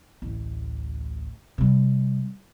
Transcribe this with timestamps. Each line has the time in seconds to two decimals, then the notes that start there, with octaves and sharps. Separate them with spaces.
0.22 A1 D2
1.58 C3 G3